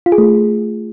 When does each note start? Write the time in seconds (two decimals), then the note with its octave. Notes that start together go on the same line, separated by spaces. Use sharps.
0.06 F4
0.12 G#4
0.18 A3